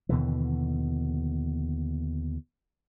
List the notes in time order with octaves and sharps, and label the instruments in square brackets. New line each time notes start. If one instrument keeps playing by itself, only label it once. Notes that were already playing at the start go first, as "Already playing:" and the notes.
[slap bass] D#2 B2 D3 E3